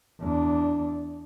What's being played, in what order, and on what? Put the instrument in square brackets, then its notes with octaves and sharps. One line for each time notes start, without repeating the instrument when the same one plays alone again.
[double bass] E2 D4